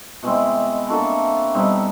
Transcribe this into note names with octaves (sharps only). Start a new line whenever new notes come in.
B2 G#3 C4 E4
A#3 D4 F#4 A4
B2 G3 C4 D#4